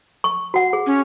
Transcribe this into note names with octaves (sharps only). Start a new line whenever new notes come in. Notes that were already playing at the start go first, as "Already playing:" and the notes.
C#6
F#4 F#5
G#4
C#4